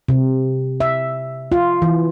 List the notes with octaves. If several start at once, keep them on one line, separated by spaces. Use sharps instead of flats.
C3
E5
F4
E3